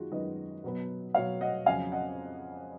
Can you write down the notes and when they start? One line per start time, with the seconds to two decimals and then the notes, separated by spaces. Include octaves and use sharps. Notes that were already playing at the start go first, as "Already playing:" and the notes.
Already playing: F#2 D#3 G#3 D#4 F4 F#4 G#4
0.11 F#2 D#3 G#3 B4 D#5
0.64 B2 F#3 B3
1.14 B2 F#3 B3 C#5 F5
1.41 D#5 F#5
1.66 F2 C#3 F#3 F5 G#5
1.92 D#5 F#5